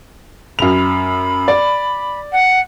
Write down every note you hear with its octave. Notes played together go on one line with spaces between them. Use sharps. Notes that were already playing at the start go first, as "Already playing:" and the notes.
F#2 B5 F7
D5
F#5